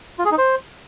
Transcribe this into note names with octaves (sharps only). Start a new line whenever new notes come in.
F4
G#4
D#4
C5